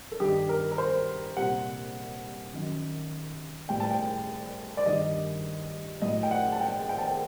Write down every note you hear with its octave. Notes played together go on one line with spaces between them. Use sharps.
A4
G2 D#3 G3 G4
A#4
A#4
C5
C2 A#2 G3 F#5
F#2 D#3 F#3
A2 G3 G5
A5
G5
D5
G2 D#3 G3 D#5
A2 F#3 D#5
G5
F#5
A5
G5
G5
A5
G5